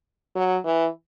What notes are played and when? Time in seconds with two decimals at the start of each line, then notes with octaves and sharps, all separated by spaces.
0.36 F#3
0.65 E3